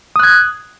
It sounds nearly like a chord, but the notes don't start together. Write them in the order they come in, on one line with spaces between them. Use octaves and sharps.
D#6 F#6 G#6